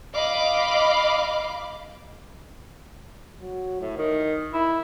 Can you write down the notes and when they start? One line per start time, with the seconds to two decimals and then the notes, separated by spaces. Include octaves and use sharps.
0.14 D#5 F5 B5 D6
3.39 F#3
3.81 A2
3.97 D#3
4.54 E4